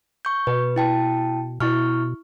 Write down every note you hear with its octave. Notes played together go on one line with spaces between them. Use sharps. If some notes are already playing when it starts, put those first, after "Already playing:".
C#6 G6
B2 B4
E4 G5 A5
B2 E4 C#6 F6